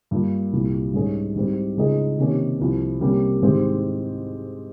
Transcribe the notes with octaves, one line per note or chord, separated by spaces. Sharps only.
G2 G3 A#3 F4
C2 A#2 G3
G#2 G3 C#4 G#4
G#2 G3 C4
C#2 C#3 G#3 D#4 G#4
C3 D#3 A#3 C#4 G4
C2 C3 F3
C3 G3 A#3 C#4 G4
G#2 D#3 G#3 C4 G4